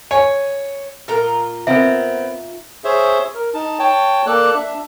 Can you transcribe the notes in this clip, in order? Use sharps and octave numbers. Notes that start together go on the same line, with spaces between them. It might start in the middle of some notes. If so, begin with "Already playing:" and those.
C#5 G#5
A#2 F4 A4 A#4 A#5
B3 C4 D#4 A#4 E5
G#4 C5 C#5 E5
A#4
D#4 A5
C#5 G5 A5
A#3 A4 D5 A5 F#6
D4 E5